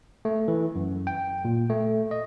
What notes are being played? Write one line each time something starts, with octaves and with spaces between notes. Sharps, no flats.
A3
E3
F#2
G5
A#2
A3
D#5